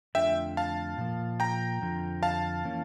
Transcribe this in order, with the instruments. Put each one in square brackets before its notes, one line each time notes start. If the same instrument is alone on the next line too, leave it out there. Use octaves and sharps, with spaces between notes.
[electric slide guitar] F2 D3 A3 D4 F4 [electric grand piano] E5 G5
[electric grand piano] F5 A5
[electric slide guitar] A#2 F3 A#3
[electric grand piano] G5 A#5
[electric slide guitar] F2 D3 F3
[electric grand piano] F5 A5
[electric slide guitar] E3 A#3 C#4